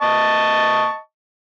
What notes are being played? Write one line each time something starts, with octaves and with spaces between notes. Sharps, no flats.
D#5 A5 C#6